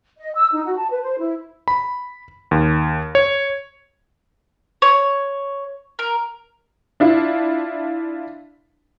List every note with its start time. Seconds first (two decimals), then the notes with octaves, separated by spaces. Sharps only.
0.18 D#5
0.35 E6
0.53 D#4
0.65 F#4
0.78 A5
0.91 B4
1.02 C5
1.19 E4
1.68 B5
2.51 D#2
3.15 C#5
4.82 C#5
5.99 A#4
7.00 D4 E4 F4